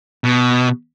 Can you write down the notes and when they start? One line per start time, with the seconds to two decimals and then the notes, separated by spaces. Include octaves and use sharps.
0.24 B2